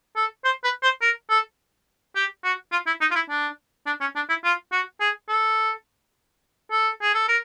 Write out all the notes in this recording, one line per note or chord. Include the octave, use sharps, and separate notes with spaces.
A4
C5
B4
C5
A#4
A4
G4
F#4
F4
E4
D#4
F4
E4
D4
D4
C#4
D4
E4
F4
F#4
G#4
A4
A4
G#4
A4
A#4